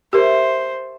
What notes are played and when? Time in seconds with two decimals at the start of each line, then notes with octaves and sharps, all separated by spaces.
0.13 G4 A#4 C5 E5 A5 C#6